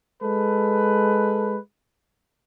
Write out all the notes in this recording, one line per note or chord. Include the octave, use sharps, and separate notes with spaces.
G#3 A4 B4